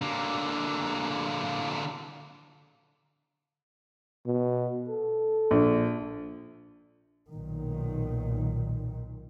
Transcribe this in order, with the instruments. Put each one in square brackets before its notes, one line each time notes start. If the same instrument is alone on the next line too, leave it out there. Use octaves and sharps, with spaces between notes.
[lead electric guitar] D3 A#3
[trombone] B2
A4
[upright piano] A#1
[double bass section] B1 A#2 D#3